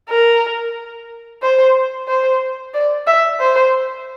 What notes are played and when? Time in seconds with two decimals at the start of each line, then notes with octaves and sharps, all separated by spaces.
0.10 A#4
1.42 C5
2.08 C5
2.74 D5
3.07 E5
3.40 C5